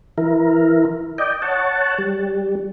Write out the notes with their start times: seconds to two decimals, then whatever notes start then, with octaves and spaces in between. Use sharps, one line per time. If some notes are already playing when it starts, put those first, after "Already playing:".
0.18 E3 E4 A#4
1.18 D5 D#5 G5
1.42 C#5 F#5 A5
1.98 G3